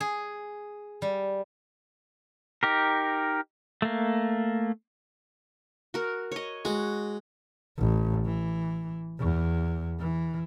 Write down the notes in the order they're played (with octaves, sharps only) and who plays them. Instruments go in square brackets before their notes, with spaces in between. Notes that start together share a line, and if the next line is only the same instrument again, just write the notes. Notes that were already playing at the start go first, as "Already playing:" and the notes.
[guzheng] G#4
G3
[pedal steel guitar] D#4 G4 A#4
A3 A#3
[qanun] F#4 A#4
C#5 D#5
[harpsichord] G#3 [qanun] F#4
[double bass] A1
E3
E2
E3